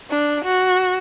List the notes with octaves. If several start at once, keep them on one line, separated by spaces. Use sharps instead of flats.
D4
F#4